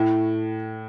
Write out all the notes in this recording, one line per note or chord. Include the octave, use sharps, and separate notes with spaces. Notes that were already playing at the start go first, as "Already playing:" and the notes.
Already playing: A2